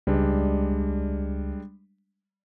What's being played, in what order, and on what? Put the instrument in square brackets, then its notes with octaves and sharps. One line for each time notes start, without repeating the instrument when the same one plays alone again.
[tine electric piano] C#2 [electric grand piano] G3 G#3 D4